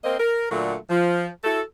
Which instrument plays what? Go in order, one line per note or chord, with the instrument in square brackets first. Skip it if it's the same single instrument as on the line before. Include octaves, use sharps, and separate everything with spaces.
[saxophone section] A#3 C4 A#4 C5 D#5
A#4
A#2 D3 F#3 A3 F#4
F3
E4 F#4 A4